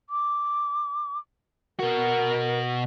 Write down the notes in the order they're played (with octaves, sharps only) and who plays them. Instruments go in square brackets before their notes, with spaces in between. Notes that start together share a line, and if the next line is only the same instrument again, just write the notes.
[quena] D6
[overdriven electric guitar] B2 F#4 [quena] A#4